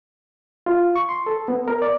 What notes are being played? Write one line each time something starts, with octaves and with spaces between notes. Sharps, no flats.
F4
C#6
C6
A4
B3
A#4
D5